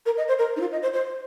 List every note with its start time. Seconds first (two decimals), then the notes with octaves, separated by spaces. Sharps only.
0.06 A#4
0.17 D#5
0.28 C5
0.39 A#4
0.56 D#4
0.60 F4
0.72 D#5
0.83 C5
0.93 C5